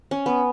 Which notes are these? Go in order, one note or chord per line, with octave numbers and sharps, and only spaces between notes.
C#4
B3